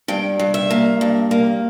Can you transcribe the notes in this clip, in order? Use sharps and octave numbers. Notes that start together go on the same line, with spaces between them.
G2 G5
G2
E5
A#3
G2
A#3